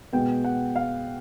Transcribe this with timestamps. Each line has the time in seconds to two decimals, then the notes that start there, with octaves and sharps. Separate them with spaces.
0.13 B2 G#3 B3 G5
0.44 F#5
0.76 F5